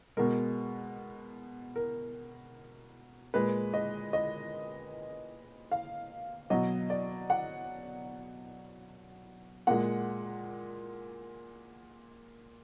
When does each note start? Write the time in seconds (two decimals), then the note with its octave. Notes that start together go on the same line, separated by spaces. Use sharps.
0.17 B2 G#3 A#4
1.76 A#4
3.34 A#2 G#3 B4
3.74 D#5
4.13 D#5
5.71 F5
6.50 B2 F#3 D#5
6.90 D5
7.30 F#5
9.67 A#2 G#3 F#5